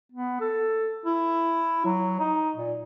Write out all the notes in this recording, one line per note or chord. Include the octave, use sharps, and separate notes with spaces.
B3
A4
E4
F#3
D#4
A#2